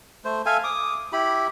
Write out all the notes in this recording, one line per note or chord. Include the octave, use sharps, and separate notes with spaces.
A3 C5
A4 E5 F5 G#5
D6 D#6
E4 G4 B5